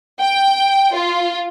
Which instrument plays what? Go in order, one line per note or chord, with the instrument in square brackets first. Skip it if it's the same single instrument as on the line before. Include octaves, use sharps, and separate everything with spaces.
[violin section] G5
F4